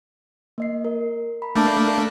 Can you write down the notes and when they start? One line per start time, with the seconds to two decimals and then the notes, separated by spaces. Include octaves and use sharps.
0.58 A#3 D#5 C7
0.85 A#4
1.42 A#5 B5
1.56 A3 A#3 D4 A5 D6 G6